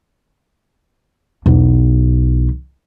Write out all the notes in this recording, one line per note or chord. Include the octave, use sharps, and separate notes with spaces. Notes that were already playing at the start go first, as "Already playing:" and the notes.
B1 E2